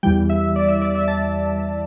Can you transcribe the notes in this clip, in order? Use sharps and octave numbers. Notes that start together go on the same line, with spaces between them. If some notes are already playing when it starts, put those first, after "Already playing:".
E2 E3 G3 G5
E5
D5
E5
D5
E5
A5